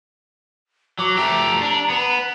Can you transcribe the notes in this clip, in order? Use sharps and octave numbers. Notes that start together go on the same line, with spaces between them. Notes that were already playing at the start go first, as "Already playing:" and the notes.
F#3 D6
A3 G4 A#5
D4
B3